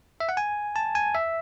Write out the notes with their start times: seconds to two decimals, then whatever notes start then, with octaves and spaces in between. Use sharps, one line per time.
0.20 E5
0.29 F#5
0.37 G#5
0.76 A5
0.95 G#5
1.15 E5